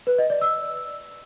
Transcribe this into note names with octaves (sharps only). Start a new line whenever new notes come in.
B4
D#5
D5
E6